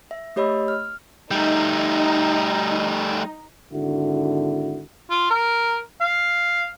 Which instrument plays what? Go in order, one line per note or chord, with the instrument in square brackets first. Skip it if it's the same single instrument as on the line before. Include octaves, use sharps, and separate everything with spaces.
[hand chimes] E5
A3 G4 C#5 D#5 B5 E6
F6
[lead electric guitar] G3 A3 [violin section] D#4
[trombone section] G#1 D3 E4 F#4
[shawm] F4
A#4
F5